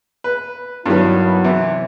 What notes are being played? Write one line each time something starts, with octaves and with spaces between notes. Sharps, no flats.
B4
G2 D#3 F#3 B3 E4
C3 E3